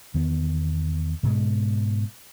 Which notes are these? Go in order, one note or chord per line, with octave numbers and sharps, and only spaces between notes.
E2 D#3 B3
G#2 B2 G#3